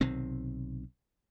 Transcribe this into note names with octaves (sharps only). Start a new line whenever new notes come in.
B1 C3 D#3 C4